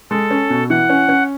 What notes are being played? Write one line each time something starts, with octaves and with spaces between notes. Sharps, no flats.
G#3 A4
C#4
B2
E3 F#5
C#4
C#4